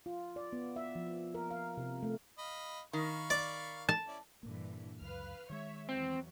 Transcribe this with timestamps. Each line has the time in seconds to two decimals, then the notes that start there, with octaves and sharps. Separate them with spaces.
0.06 F4
0.36 D5
0.53 B3
0.76 E5
0.95 F3
1.35 A#4
1.51 F5
1.77 C3
2.03 A3
2.38 D#5 F5 B5
2.93 D#3 F5 B5 C#6
3.30 D5
3.89 A5
4.07 C#4 E4 D5
4.43 G2 A#2 D3 E3 A#3
5.01 C#2 F#2 B4 F5 F6
5.50 D#3 G#3 C#5 E5
5.89 E2 F#3 C4